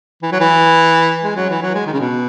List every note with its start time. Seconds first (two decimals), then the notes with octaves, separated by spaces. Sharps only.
0.23 E3
0.32 F#3
0.41 E3
1.24 G#3
1.36 F#3
1.50 E3
1.62 F#3
1.75 G#3
1.87 D#3
1.93 C#3
2.00 B2